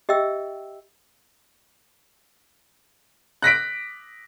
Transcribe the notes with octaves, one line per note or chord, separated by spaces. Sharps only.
G4 D#5 E5 G5 E6
F#6 A#6 B6 D7